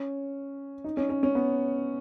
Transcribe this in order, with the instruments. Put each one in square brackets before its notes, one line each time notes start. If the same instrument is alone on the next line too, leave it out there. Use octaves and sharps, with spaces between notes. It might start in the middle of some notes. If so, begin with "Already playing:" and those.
Already playing: [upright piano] C#4
D#4
C#4
C#4
C#4
B3